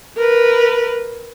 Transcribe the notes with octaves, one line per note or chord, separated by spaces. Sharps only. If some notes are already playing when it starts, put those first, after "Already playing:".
A#4 B4